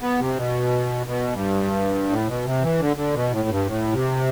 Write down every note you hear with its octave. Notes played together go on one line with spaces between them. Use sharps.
B3
C3
B2
B2
G2
A2
B2
C3
E3
D3
D3
B2
A2
G2
A2
C3